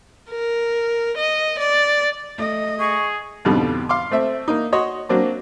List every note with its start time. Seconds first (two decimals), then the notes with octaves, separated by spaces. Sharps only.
0.31 A#4
1.17 D#5
1.59 D5
2.38 A3 D#5
2.80 G#4 C#6
3.45 F2 G#2 B2 D3 G3
3.89 F5 C6 D6
4.11 A3 C4 E5
4.48 A#3 D#4
4.72 F#4 C#5 D#5 C6
5.09 F#3 A#3 C4 D4